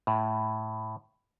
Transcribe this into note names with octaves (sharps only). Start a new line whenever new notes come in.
A2